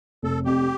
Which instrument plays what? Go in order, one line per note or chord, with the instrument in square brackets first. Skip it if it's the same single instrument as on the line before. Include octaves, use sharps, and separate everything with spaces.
[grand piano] F1 [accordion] A4
[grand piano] F2 [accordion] G4